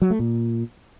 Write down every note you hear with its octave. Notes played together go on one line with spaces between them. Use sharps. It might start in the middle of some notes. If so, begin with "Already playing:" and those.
F#3
A3
A#2